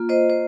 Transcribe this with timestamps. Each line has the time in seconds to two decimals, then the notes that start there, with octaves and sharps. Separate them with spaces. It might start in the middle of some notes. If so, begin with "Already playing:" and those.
Already playing: A#3 F4
0.09 C5 D#5
0.30 C5